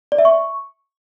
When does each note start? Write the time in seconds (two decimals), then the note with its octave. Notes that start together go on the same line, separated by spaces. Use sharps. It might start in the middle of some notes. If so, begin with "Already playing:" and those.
0.12 D5
0.18 E5
0.25 C#6